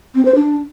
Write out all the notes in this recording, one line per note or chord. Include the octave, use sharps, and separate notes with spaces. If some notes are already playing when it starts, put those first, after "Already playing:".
C4
C5
D4